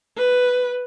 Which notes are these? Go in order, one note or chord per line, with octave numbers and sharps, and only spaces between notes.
B4